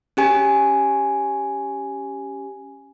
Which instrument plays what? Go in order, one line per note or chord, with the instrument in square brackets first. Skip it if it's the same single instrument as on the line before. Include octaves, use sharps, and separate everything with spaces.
[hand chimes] C#4 G4 G#5